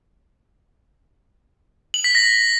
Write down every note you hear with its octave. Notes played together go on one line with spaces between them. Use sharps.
F#7
B6
A#6